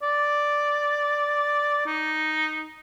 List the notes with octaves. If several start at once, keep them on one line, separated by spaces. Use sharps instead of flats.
D5
D#4